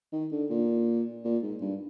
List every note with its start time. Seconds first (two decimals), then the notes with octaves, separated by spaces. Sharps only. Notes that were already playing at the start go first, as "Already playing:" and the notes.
0.12 D#3
0.31 D3
0.50 A#2
1.24 A#2
1.43 G#2
1.61 G2